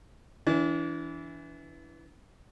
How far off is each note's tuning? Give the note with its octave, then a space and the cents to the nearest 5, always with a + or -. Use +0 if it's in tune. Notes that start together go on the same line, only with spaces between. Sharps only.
E3 +0 D4 -35